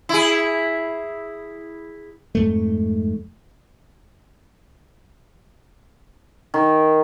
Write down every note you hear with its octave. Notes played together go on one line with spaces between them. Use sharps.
E4 G#4
F2 G#2 A3
D#3